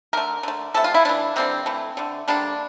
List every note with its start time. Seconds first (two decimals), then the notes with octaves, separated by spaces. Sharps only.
0.13 D3 A3 A#4
0.43 D3 A3
0.74 C3 E3 A3 A4
0.84 F4
0.94 E4
1.05 E3 A3 D4
1.36 D3 G3 A#3 C4
1.66 E3 A3
1.97 D3 A3
2.28 D3 G3 A#3 D4